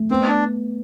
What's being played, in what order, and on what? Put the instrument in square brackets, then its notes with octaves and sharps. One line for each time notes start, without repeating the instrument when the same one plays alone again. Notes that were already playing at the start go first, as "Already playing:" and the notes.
Already playing: [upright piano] A3
[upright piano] B3 [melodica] C4
[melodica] D4